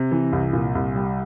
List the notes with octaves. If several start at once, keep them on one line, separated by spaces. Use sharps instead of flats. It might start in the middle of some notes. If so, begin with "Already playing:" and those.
Already playing: C3
E3
C2
A#2
C2
G3